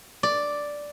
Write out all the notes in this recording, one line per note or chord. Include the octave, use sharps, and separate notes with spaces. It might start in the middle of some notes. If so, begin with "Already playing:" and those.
D5